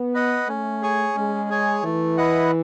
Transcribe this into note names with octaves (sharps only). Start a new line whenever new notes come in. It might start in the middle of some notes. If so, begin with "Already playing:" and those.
Already playing: B3
B4 D#5 F#5
A3 C#4
G#4 C#5 G#5
G#3 C#4
G#4 C#5 G#5
E3 A3
E4 B4 D#5 F#5